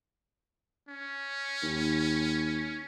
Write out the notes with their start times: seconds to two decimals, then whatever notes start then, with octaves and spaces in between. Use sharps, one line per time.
0.88 C#4
1.63 D#2